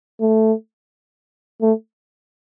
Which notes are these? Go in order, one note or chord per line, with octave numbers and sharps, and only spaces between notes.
A3
A3